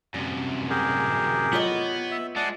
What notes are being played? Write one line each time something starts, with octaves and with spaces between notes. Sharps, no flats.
F#2 C3 G3
G4 G#4 A#4
B3 F4 C#5 D#5
E5
G#3 D5 F#5 A5